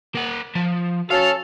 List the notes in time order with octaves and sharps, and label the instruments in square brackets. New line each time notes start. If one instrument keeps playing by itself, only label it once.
[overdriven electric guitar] A#3 F#5
F3
[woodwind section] C#4 F#4 A4 [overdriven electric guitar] F5